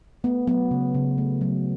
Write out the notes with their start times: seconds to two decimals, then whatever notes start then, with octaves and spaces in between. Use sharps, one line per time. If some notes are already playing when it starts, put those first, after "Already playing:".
0.24 A3 B3
0.47 F#3 B3
0.71 C#3
0.94 C#3
1.18 A3
1.41 F#3